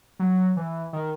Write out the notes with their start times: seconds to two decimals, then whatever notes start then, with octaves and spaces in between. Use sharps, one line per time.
0.19 F#3
0.57 E3
0.93 D#3